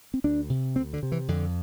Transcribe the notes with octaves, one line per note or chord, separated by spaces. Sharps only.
C4
D2 D4
C3
D2 C4
D3
C3
E3
F2 D3